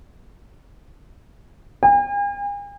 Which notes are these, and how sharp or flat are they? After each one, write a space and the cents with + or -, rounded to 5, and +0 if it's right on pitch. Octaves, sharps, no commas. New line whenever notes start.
G#5 -45